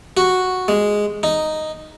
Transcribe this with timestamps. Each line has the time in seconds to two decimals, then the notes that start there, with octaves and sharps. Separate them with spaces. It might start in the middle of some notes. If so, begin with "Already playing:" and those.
0.17 F#4
0.68 G#3
1.23 D#4